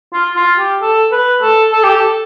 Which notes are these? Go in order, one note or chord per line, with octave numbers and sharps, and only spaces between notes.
F4
F4
G4
A4
B4
A4
A4
G4
A4